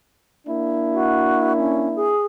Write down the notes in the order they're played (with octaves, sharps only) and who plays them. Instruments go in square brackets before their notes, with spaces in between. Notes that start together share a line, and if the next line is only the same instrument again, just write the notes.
[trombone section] A#3 D4 E4
[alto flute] F#4
C#4
G#4